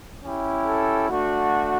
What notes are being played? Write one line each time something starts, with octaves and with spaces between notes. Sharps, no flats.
C#4 E4 G4
A4
A3 D4 F#4